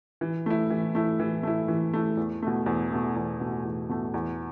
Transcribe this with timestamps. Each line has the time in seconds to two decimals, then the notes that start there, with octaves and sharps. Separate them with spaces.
0.21 E3
0.46 A3 E4
0.70 E3
0.95 A3 E4
1.20 E3
1.43 A3 E4
1.68 E3
1.93 A3 E4
2.17 E2
2.42 B2 A3
2.66 E2
2.91 B2 A3
3.16 E2
3.40 B2 A3
3.65 E2
3.89 B2 A3
4.14 E2